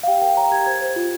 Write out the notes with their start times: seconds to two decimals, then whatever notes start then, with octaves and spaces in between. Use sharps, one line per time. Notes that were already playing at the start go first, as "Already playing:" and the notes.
0.03 F5
0.07 G4 G5
0.22 A#4 G5
0.37 C#5 A#5
0.51 G4 G#6
0.66 C5 G#6
0.81 C5
0.96 F4